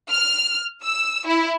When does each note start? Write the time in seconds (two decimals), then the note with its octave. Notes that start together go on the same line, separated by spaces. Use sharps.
0.11 F6
0.83 E6
1.26 E4